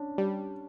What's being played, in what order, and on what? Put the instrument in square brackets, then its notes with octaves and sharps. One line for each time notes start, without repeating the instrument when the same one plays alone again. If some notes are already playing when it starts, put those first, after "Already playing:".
Already playing: [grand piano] C#4 D4
[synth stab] G3